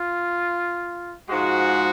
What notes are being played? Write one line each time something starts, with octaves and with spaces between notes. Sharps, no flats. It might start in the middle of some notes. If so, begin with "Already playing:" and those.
Already playing: F4
G#2 F3 G#3 F#4